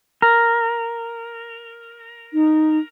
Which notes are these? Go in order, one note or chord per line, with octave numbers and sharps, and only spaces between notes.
A#4
D#4